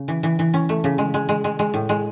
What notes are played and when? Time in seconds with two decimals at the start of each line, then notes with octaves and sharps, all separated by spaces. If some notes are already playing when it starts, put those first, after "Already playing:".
Already playing: C#3
0.08 E3
0.23 E3
0.39 E3
0.54 C#4
0.69 A3
0.84 C#3
0.98 G#3
1.14 G#3
1.29 G#3
1.44 G#3
1.59 G#3
1.74 A2
1.89 G#3